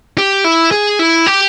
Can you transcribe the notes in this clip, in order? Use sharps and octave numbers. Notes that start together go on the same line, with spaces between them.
G4
E4
G#4
E4
G4